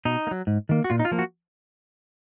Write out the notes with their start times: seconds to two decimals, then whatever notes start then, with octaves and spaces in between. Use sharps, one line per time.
0.05 B2 D#4
0.27 A#3
0.31 F#3
0.47 G#2
0.69 D#3 A#3
0.84 F#4
0.90 A#2 F4
0.99 D#4
1.05 F4
1.11 F3 A#3
1.19 F#4